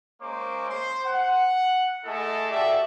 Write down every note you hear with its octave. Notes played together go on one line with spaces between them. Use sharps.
G#3 A#3 C#4 C5 C#6 D6
C5 C6
F#5
A3 E4 G#4 A4 D#5 A5
F#4 G4 A4 D5 E5